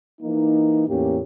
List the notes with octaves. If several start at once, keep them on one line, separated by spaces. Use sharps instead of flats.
E3 A#3 D#4
E2 A2 A#3 C#4 G4